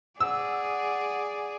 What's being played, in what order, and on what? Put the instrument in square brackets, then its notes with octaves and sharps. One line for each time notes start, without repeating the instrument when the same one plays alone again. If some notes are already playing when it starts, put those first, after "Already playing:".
[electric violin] G#4 D5 [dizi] F#5 [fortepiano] E6